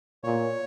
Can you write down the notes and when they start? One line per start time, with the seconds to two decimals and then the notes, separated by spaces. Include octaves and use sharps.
0.24 A#2 C#5